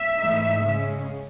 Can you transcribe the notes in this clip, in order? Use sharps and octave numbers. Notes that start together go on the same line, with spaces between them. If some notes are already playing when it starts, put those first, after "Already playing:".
Already playing: E5
G#2 E3 A3 D#4
C#3 G#3 C#4